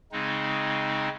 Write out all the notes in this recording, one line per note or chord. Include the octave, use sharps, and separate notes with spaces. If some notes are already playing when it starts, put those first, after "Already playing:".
C#3 G#3 C4 D#4